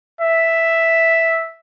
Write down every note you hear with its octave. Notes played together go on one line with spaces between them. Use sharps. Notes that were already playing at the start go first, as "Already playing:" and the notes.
E5